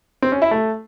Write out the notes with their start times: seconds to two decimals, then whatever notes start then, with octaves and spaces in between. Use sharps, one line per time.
0.22 C4
0.32 C#4
0.42 E4
0.51 A3